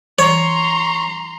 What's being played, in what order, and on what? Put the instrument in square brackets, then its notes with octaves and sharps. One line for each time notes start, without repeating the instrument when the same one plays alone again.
[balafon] E3 [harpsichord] C#5 [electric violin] A#5 C6 [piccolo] C#6